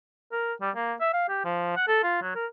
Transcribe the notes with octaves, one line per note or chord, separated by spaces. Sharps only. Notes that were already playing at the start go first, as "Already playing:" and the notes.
A#4
G3
A#3
E5
F5
G4
F3
F#5
A4
F4
F#3
A#4